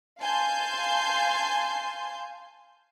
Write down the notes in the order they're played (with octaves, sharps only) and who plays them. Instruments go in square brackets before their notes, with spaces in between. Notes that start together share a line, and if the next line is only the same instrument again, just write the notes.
[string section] F5 G#5 A5 C6 G6